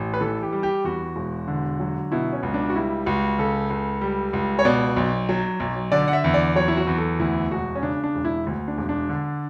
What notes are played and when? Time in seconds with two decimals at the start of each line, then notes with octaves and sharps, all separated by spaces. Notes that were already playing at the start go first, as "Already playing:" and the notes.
Already playing: A1
0.14 B4
0.21 E3 A4
0.42 G4
0.52 G3
0.63 G4
0.84 E2 F#4
1.16 E1
1.48 D3
1.80 F#3
2.12 B2 E4
2.33 C#4
2.43 C#2
2.54 D4
2.70 F#4
2.75 G3 E4
3.06 C#2 F#4
3.39 C#3 A4
3.70 C#2
4.01 G3
4.33 C#2
4.59 C#5
4.65 B2 D5
4.96 B1
5.29 F#3
5.60 B1
5.92 D3 D5
6.08 F#5
6.13 E5
6.24 E2
6.34 D5
6.56 F#3 C#5
6.68 E4
6.77 F#4
6.87 E2
6.98 A4
7.19 D2 E4
7.51 E1 F#4
7.75 C#4
7.82 C#3 D4
8.04 D4
8.15 E1
8.25 E4
8.47 D2
8.68 D4
8.77 E1
8.89 D4
9.09 D3